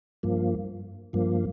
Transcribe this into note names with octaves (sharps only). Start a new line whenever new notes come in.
G2 F3 A#3
G2 F3 A#3